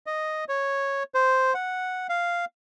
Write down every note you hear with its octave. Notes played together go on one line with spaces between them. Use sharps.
D#5
C#5
C5
F#5
F5